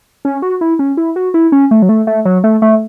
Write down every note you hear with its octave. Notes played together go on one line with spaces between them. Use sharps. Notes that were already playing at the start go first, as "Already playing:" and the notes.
C#4
F#4
E4
C#4
E4
F#4
E4
C#4
A3
F#3
A3
A3
F#3
A3
A3